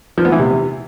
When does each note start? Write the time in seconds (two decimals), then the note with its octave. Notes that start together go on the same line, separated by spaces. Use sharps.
0.18 F3
0.25 B3
0.32 E3
0.39 C3